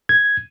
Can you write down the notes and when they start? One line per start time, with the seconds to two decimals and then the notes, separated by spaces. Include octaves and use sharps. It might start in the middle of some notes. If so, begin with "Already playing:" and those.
0.09 G#6